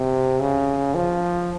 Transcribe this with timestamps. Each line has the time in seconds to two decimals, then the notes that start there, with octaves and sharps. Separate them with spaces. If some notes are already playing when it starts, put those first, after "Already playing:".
Already playing: C3
0.40 C#3
0.95 F3